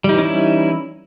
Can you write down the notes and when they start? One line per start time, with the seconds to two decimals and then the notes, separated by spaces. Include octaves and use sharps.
0.04 G3
0.09 D#4
0.14 E3
0.19 C#4
0.23 E4